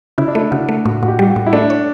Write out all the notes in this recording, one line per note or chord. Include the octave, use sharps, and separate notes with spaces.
C#3 E4
D4
A3 E4
C#3 F#4
A3
A2 F#4
A2 F#4
G4
G3 G4
F#4
A2
E4
A3 D4
C#5